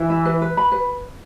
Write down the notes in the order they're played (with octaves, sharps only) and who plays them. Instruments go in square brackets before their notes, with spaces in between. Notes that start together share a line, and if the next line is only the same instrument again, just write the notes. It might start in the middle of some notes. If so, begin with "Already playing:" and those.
Already playing: [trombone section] E3
[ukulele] E4
B4
B4
B5
B4